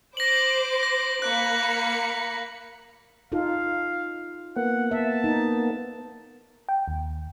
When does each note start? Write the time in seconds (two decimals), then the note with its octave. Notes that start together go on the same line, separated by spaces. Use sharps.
0.17 C5 D6 A#6 F#7
0.83 A#6
1.22 A#3 B5 F#6 C#7
3.32 D#4 F4 A4 F5
4.56 A#3 B3 F#5
4.91 E5 A5
5.24 D#4
6.69 G5
6.88 D#2